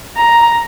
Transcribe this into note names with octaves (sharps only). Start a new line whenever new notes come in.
A#5